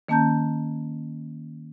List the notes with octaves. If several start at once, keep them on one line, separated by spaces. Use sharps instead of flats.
D#3 A#3 C#4 A5 A#5 G6